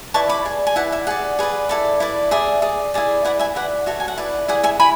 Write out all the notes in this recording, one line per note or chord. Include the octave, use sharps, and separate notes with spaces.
E4 B4 D5 A5 C#6
B5 D6
G#4 D5
G#5
E4 B4 D5 F#5
E5
G#4 D5 F#5
G#4 B4 D5
E4 A4 D5
E4 B4 D5
G#4 D5 E5
G#4 D5
E4 G#4 D5
E4 B4 D5 F#5
E5 G#5
E4 B4 D5 F#5
F#4 A4 C#5 E5
G#5
F#5
E4 B4 D5
E4 G#4 D5 F#5
E5 G#5
E4 G#5 B5